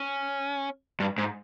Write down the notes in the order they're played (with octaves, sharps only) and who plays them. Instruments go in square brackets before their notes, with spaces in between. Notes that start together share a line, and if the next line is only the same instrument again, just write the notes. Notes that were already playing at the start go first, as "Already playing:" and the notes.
Already playing: [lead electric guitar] C#4
[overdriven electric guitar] G2
G#2